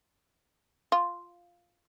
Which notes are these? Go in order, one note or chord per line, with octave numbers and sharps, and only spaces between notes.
F4